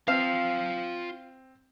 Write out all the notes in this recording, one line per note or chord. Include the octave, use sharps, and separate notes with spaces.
C4 F4 F5 A5